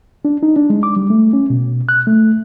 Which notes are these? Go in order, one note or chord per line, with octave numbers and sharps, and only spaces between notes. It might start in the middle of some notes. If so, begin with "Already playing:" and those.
D4
D#4
D4
G#3
D6
G3
A3
C#4
B2
F#6
A3